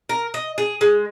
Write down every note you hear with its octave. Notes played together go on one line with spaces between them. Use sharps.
A#4
D#5
G#4
G#3